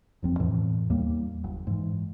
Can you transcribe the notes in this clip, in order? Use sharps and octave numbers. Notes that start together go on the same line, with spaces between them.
F#1 F2 C4
E2 A2 E3
D#2 G3 A#3
F#1
G#2 E3